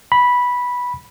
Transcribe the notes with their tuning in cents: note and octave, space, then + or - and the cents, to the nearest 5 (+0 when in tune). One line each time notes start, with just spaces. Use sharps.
B5 -10